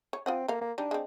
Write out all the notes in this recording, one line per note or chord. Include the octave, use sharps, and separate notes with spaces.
C#5
C4 F4 D#5 F#5
A#3 A4 F5
A#3
G3 D4 D#4
G#3 C4